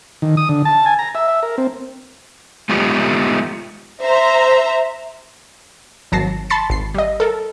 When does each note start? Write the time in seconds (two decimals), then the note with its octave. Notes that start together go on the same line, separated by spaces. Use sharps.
0.22 D#3
0.37 D#6
0.49 D3
0.65 A5
0.86 G#5
0.99 A#5
1.15 E5
1.28 E5
1.43 A#4
1.58 C4
2.69 G#3 A3 B3 D#4 F4 G4
4.02 C5 E5 A#5
6.12 G#1 F#3 A5 A#6 C7
6.50 A5 B5 C6 A6 C7 C#7
6.70 G#1 C7
6.94 G3 D#5
7.20 A4 A#4